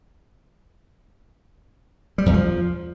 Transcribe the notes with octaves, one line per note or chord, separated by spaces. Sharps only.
G3
E2
F3